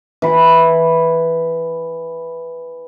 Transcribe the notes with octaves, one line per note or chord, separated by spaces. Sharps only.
E3 B5